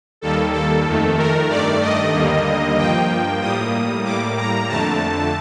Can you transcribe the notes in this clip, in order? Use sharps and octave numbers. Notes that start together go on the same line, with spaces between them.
D#2 D#3 G3 A#3 A4
A4
F2 D#3 A3
A#4
G2 D#3 A3 D5
D#5
D#2 D3 G3 A#3
G2 F3 A#3 G5
A2 G3 A#3 D#6
A2 G3 A#3 D6
A#5
F2 D3 A3 A5